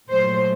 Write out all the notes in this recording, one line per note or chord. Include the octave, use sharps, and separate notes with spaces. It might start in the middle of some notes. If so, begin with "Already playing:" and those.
A#2 F#3 A3 C5